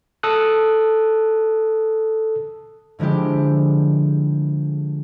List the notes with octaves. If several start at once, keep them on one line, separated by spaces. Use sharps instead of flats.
A4 D#6 F#6
D3 F3 G#3 E4 G4